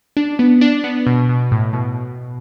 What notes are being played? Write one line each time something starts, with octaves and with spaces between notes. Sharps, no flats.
D4
B3
D4
B3
B2
B2
A2
B2